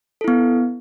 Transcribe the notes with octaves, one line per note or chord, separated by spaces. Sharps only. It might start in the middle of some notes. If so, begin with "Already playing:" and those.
B3 E4 A4